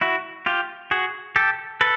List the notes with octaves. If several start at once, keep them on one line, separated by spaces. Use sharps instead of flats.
E4 F#4
F4 G4
F#4 G#4
G4 A4
A4 B4